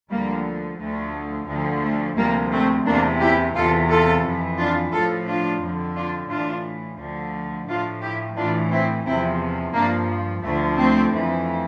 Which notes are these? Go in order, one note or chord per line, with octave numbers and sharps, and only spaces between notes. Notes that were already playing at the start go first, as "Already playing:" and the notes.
D2 D3 F3 G3 A#3
D2 D3 F3 A3
D2 D3 F3
A3
D2 C3 F3 G3 A#3
A3 C4
E2 C3 E3 A#3 D4
E4 G4
E2 C3 E3 F4 A4
F4 A4
F2 E3
D4 F4
A2 F3 F4 A4
D4 F4
F2 D3 F3
D4 F4
A2 E3 D4 F4
D2 D3 F3
A2 F3 D4 F4
E4 G4
A2 E3 D4 F4
C4 E4
E2 C3 F3 C4 E4
G2 F3 A#3 D4
D2 D3 F3 A3
A3 C4
F2 E3